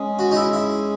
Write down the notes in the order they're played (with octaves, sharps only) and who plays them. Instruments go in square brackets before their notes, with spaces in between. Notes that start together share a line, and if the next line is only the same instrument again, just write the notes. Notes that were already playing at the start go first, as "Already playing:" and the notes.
Already playing: [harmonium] G#3 C#4 G#4
[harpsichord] F#4
D#4
E4
E4